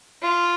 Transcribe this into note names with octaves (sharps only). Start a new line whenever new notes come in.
F4